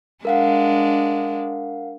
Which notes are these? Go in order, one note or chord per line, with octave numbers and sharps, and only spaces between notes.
G#3 D4 A#4 F5 F#5